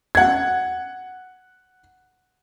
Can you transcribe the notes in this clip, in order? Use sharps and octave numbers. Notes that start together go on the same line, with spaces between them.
F#5 G#6